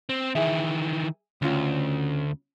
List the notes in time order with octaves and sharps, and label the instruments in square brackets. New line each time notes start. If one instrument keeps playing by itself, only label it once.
[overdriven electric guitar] C4
[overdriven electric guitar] D#3 E3 [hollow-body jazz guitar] G#4 E5
[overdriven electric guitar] D2 [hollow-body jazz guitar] C#3 C#4 F4